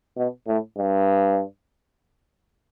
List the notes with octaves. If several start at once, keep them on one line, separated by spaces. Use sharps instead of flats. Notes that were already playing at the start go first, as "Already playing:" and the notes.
B2
A2
G2